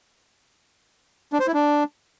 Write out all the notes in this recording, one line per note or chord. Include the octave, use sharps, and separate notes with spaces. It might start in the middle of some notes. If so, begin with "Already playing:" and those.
D4
C5
E4
D4